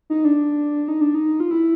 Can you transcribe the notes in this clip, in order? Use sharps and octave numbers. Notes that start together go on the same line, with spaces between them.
D#4
D4
D#4
D4
D#4
F4
E4